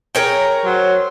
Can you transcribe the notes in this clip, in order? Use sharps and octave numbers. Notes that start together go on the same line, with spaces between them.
G#4 A#4 C#5 G5 A#5
F#3 C5